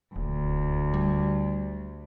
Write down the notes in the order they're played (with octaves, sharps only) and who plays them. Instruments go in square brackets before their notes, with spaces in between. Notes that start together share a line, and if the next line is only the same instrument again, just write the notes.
[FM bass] D#1 [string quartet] D2
[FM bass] G3